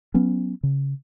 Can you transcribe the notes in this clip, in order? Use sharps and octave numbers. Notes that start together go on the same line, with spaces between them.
F#3 B3 C#4
C#3